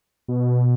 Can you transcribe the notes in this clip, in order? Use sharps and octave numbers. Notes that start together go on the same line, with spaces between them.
B2